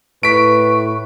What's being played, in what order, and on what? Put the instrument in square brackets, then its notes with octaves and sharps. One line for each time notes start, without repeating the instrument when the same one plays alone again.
[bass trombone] A2 [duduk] B4 [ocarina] C#6 [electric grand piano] B6 D7